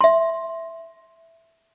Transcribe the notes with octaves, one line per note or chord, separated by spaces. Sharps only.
E5 C6